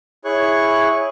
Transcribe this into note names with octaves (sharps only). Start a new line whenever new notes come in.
E4 G#4 C#5 C#6 F#6